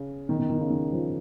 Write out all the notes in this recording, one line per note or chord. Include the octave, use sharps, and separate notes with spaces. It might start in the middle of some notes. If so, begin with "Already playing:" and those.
Already playing: C#3
D#3
D#3
D#3
C#3
D#3
F3